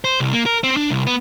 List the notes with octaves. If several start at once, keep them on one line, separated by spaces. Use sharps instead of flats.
C5
C2
A#3
A#4
C4
D4
C2
B3